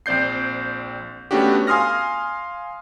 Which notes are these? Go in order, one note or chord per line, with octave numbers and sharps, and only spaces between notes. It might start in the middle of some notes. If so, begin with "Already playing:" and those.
A#1 C4 D5 G6 C7
A3 B3 C#4 D4 F#4 G4
F5 G#5 C6 D#6 F6 A#6